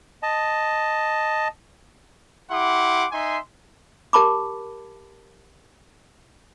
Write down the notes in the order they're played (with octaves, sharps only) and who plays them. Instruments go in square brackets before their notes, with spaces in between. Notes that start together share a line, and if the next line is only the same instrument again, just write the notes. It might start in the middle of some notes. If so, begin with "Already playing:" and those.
[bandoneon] D#5 A5
[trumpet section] E4 G4 F#5 C6 D6
D#4 E5 G#5 C6
[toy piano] G4 A#4 A5 B5 D6